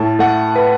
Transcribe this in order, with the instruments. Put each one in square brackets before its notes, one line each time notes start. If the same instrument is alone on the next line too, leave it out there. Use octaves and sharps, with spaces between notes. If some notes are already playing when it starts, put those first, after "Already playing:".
Already playing: [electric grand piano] A2 A5
A3 F#5
B4